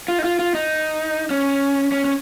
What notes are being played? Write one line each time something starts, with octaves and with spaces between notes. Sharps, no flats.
F4
D#4
F4
F4
D#4
C#4
C#4
C#4